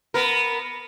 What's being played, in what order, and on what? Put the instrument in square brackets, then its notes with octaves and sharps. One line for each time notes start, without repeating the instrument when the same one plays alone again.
[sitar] B3 A#4